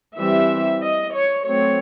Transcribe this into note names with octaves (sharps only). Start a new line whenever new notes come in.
E3 G3 C4 E5
D#5
C#5
F#3 A3 C4 C#5